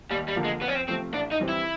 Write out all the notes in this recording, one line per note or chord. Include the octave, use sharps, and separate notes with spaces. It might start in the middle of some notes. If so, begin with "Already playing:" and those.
D#2 G3
G3
D3 F3 A#3
G#3
F2 B3
C#4
C4
C3 F3 A3 C4
A1 D4
D#4
G2 E3 G3 C4
E4